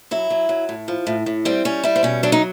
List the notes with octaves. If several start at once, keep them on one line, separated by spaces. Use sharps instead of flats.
F#3 E4
F#3
F#3
A2
F3
A2
A2
G3 C4
G3 C#4
G3 E4
C4
B2 C#4
F#3 D4
D#4